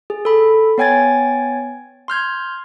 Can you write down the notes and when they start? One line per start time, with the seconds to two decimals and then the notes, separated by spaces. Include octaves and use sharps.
0.10 G#4
0.25 A4 B5
0.78 B3 C#5 G5 G#5 G#6 A6
2.08 C6 F6 G6 G#6